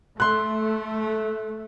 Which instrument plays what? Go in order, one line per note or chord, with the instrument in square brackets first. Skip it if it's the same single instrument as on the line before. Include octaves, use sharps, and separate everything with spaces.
[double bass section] A3 [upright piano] C6 F#6